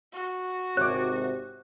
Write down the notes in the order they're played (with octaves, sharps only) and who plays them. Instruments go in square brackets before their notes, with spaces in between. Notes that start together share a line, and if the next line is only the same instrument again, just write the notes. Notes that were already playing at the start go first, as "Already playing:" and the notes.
[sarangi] F#4
[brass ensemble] G#1 C3 [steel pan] C#5 D6 [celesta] F#6